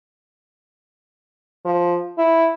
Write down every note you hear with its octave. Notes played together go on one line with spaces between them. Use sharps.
F3
E4